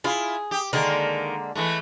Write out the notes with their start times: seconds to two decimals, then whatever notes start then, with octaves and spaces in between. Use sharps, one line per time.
0.04 E4 F4 G#4
0.51 G4
0.73 D3 D#3 G#3 A#3 A#4
1.55 E3 G#3 A3